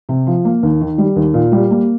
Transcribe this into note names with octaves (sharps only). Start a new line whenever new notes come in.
C3
F3
A#3
D#2
D#3
G3
D#2
A#2
G3
A#3